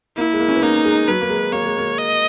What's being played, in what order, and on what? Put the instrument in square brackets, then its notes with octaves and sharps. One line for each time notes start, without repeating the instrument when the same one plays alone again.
[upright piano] A#3 [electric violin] E4
[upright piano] G#3
A#3
C#4
B3
[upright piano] A#3 [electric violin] D#4
[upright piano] G#3
[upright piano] F#3 [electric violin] B4
[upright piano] A#3
G#3
[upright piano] A#3 [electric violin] C#5
[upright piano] G#3
A#3
[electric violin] D#5